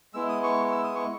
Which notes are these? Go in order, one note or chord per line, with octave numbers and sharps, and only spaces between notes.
G#3 B3 E4 E6
D#6
C#6
E6
D#6
C#6